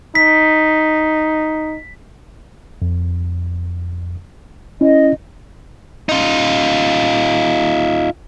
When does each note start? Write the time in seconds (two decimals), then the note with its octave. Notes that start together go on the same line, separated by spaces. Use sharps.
0.15 D#4 B6
2.82 F2
4.81 C#4 E4 D#5
6.09 D#4 F4